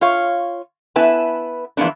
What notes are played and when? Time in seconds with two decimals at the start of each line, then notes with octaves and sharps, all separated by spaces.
0.01 F4 C#5 F5
0.96 B3 E4 B4 G#5 A5
1.77 E3 F3 G#3 A#3 B3 D4